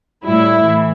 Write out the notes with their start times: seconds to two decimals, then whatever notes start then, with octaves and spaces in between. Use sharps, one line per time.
0.25 A2 G3 E4
0.64 E3